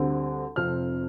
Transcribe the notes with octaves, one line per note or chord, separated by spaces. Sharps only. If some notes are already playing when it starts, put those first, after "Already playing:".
Already playing: D2 D3 G3 C4
F1 F2 F3 C4 F6